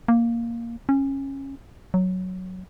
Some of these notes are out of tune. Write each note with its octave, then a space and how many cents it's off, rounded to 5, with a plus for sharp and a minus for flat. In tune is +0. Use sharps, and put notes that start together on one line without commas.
A#3 +0
C#4 -20
F#3 +0